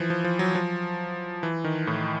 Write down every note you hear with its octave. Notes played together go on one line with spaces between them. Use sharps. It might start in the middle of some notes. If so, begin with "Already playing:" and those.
Already playing: E3 F3
F3
F3
F#3
F3
E3
D#3
A2